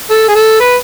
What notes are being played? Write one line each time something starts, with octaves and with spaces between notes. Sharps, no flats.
A4
G#4
A4
B4